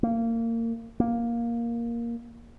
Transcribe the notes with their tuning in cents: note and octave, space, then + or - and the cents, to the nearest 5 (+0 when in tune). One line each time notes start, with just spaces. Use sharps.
A#3 -25
A#3 +5